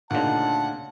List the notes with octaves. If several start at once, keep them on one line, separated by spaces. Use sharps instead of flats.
D2 A#2 C#3 D4 D#4 F#5 A5